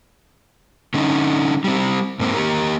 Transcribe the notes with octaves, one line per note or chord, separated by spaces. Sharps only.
D3 C#4 D#4
G3 C4
G#2 A#3 C4
A#3 G4 A#4